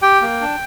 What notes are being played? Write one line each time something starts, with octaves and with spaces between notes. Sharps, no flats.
G4 G5
A#3
D4